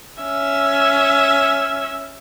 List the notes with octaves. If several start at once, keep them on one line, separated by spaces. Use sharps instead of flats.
C#4 E5